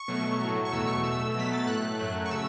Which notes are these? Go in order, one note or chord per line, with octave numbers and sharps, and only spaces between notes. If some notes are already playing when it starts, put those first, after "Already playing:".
Already playing: C#6
B2 F#3 A3
A2 F#3 A3
C#6
E2 B2 F#3 A3 E6
C#6
B2 A3 E6
B2 F#3 A3 B6
A6
A2 A3 F#6
F#2 F#3 A3
C#6
C#3 A3 E6